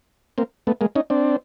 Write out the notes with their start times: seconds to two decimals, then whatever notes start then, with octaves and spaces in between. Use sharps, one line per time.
0.38 A#3 C4
0.67 A3 B3
0.81 G#3 A#3
0.96 C#4 D#4
1.10 C4 D4